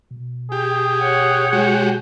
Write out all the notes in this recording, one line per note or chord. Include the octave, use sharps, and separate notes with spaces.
B2
G4 G#4
C#5 F#5
G#3 F#4 G4